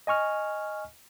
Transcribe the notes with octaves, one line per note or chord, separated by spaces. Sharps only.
D#5 G#5 C#6 F6